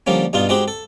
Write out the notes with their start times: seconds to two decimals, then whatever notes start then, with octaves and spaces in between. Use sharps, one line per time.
0.07 D3 F3 G3 A#3 C#4
0.33 G2 B2 D#4 F4
0.49 G#3 C4 D#4 F#4 G4
0.68 A4